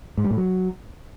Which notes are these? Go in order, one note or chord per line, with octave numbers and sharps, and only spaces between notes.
G#2
G3
A2
F#3